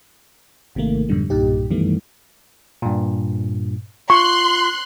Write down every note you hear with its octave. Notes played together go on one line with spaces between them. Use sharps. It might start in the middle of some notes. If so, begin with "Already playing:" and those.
G#1 C3 D#3 A3 A#3
F2 G#2 B2 D3 G3
B1 G2 A#2 D#4 G4
F#2 D#3 E3 G3 A3 B3
G2 A#2
F4 C6 C#6 F#6